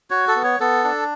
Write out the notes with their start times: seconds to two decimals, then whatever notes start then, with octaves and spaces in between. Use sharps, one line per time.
0.10 F#4 C#5
0.28 A4
0.35 B3
0.44 C#5
0.60 B3 A4
0.84 D4